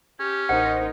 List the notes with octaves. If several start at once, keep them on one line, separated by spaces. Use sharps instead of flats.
C#4 G4
A1 D#4 A#4 C5 D#5 F#5